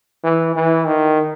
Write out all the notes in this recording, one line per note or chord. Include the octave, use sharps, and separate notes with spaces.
E3
E3
D#3